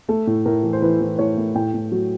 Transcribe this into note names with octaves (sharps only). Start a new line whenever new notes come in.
A3 A4
A2
A2 A#4
E3
C5
E3 B4
E3 C5
A2 C#5
A3
A2 G5
A2
F#3